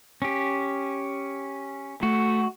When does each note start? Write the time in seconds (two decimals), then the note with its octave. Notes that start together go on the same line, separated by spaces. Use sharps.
0.22 C#4 G4
2.03 A3 F#4